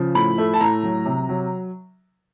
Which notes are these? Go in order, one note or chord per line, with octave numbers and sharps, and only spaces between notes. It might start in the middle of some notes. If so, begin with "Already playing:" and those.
Already playing: C#3 F3
A2 B5
A3
A5
A2 A#5
F#3
C3
F#3